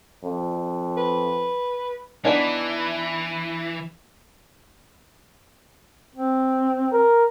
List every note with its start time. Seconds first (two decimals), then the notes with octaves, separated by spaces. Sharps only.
0.24 F2
0.97 B4
2.25 E3 B3 D4 D#4
6.15 C4
6.92 A#4